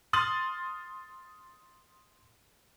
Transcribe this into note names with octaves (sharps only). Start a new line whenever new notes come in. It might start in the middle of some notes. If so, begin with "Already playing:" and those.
C6 D#6 F6 A6 F#7